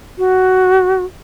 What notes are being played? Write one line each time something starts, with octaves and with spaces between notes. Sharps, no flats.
F#4